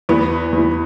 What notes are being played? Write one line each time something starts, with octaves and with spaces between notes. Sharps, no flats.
E2 E3 B3
E2 E3